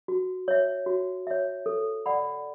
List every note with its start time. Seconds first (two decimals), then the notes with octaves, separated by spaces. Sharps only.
0.08 F#4
0.48 C#5 E5
0.86 F#4
1.27 C#5 E5
1.66 A4
2.06 D5 F#5 B5